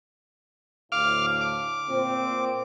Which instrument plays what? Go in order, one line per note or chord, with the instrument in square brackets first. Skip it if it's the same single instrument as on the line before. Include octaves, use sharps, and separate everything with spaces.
[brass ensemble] D2 A2 [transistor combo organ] F5 D6 F6
[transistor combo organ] D6
[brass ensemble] A#2 C4